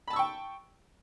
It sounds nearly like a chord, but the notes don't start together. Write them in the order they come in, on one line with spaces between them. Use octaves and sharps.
B5 A5 E6 C#6 G5